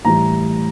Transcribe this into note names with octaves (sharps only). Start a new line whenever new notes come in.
A2 E3 G3 A#5